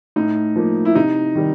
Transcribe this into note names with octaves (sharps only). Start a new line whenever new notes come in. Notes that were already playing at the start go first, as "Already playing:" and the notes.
A2 D#4
F3 A#3
E4
C3 D#4
D#3 G3